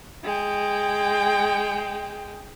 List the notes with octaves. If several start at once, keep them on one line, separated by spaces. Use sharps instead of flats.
G#3 G5